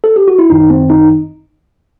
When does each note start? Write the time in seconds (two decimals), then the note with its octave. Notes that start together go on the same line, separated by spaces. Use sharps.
0.04 A4
0.16 G4
0.28 F#4
0.39 E4
0.49 G1 F#2 D#3 D#4
0.70 C4
0.90 D#4